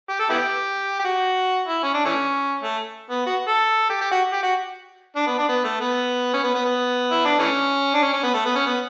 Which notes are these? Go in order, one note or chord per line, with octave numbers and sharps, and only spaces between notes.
G4
A4
B3 E4 G4
G4
F#4
E4
C#4
D4
E3 A3 C#4
A3
B3
F#4
A4
G4
G4
F#4
G4
F#4
D4
B3
D4
B3
A3
B3
C#4
B3
B3
B3
E4
D4
E3 A3 C#4
D4
C#4
C#4
B3
A3
B3
C#4
B3